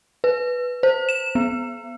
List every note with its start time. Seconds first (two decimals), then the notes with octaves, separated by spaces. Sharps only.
0.24 B4
0.83 C5
1.09 E7
1.35 B3